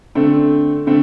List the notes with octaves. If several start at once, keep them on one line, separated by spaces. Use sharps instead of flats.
D3 A3 C4
D3 A3 C4